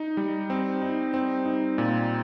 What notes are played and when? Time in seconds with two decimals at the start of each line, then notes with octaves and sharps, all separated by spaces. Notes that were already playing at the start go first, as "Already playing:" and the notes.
Already playing: D#4
0.17 G3
0.50 C4
0.82 D#4
1.14 C4
1.46 D#4
1.78 A#2